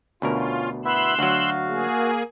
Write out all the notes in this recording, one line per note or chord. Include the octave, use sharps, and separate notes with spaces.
D2 B2 C#4 F4 A#4
B3 E4 E5 C6 E6 F#6
D2 F#3 F#4 F5
A#3 G#4